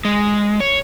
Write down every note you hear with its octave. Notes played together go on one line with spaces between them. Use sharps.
G#3
C#5